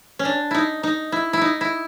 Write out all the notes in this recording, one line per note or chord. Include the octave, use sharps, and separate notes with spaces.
C#4
D4
D#4 E4
D#4
E4
E4
D#4
E4